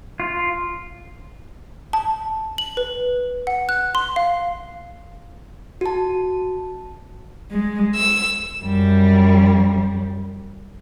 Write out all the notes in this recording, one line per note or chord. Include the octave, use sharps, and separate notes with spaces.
F4
A5
F#7
B4
F#5
F#6
C6
F5
F#4 A5
G#3
E6
F#2 G3